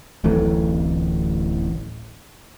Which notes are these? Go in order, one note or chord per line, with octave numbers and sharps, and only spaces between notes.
D1 A1 E3 A3